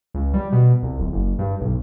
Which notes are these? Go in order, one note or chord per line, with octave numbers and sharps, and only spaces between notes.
C#2
G3
B2
C2
D1
F#1
G2
B1